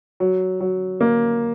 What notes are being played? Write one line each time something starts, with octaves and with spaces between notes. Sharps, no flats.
F#3
F#3
A#3